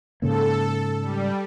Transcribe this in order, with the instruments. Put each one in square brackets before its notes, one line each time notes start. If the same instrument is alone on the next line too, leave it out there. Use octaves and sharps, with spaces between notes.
[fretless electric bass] G#2 C#3 A#3 [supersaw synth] A4
[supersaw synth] G3